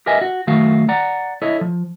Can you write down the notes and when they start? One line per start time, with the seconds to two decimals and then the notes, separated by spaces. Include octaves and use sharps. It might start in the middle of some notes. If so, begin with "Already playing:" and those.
0.06 G4 A#4 B4 D#5 E5 G#5
0.21 F#4
0.47 F#2 D#3 A3 F#4 F5
0.89 D5 F#5 A#5
1.42 E4 A4 C#5 D#5
1.61 F3